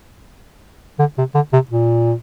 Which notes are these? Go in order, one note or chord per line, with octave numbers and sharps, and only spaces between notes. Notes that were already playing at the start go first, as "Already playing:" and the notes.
D3
C3
D3
C3
A#2